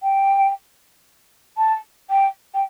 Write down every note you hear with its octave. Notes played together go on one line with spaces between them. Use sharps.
G5
A5
G5
G5